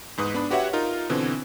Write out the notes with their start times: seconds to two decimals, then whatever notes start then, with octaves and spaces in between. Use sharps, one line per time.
0.17 E2 G#2 B4 D#6
0.34 B3 D4 B5
0.50 F#4 G4 B4 C#5 E5 F#5
0.73 D#4 F4 A#4
1.10 B2 D3 E3 C4